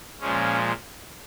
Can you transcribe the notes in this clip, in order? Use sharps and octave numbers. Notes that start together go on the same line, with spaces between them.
A#2 F3 G#3 C#4